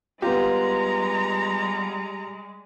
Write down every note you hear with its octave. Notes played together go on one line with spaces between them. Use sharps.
G3 G#3 B3 F4 G4 A#5